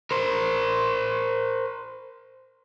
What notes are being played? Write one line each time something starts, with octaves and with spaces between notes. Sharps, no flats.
A#4 C5